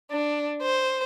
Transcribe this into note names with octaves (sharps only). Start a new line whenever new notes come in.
D4
C5